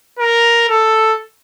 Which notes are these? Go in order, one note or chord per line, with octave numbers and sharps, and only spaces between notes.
A#4
A4